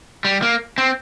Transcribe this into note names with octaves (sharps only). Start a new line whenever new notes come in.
G3
A#3
C4